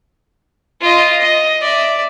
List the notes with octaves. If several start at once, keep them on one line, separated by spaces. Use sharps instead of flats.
F4 D#5
D#5
D5 E5